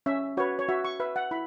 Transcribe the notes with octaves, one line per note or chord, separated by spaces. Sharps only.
C#4 E5
F#4 B4 C#5
C#5
F#4 E5
C#6
B4 E5
F#5
E4 B5